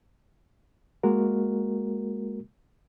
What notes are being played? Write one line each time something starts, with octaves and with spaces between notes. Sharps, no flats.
G#3 A#3 F#4 A#4